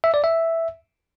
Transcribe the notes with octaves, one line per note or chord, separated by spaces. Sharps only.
E5
D5
E5